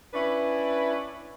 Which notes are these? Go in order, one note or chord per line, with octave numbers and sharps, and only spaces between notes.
C#4 D4 E4 B4